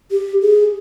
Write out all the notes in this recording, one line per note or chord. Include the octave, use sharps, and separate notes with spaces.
G4
G#4